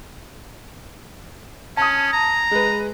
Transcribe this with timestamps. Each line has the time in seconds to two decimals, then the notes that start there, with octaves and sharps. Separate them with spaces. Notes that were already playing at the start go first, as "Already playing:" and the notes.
1.77 C#4 A5 D#6
2.13 A#5
2.51 G#3 B4